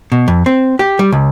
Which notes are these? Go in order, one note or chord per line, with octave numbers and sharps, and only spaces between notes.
B2
F2
C4
G4
G3
C#2